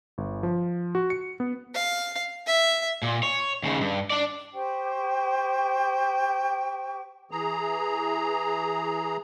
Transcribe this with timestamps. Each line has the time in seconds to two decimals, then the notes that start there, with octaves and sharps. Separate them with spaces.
0.18 G1
0.43 F3
0.95 F#4
1.10 C#7
1.40 B3
1.74 F5
2.47 E5
3.03 A#2
3.23 C#5
3.63 D#2 C#3
3.81 G2
4.10 D4 D5
4.54 G4 C5 G5 C#6
7.31 E3 G#4 A#5